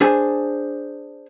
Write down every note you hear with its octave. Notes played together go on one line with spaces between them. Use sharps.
D4 G#4 C5 G#5